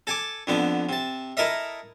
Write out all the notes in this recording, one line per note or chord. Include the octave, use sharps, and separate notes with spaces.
A4 G#5 A5 D6
F2 D3 B3
C3 A5
E4 A4 A#4 D#5 E5